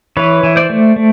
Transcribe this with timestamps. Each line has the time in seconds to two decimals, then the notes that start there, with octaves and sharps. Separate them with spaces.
0.17 E3 B4 C#5
0.43 E3
0.56 C5 D5
0.70 A3
0.96 A3